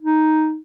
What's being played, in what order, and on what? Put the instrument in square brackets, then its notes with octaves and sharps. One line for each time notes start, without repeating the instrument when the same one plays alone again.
[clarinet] D#4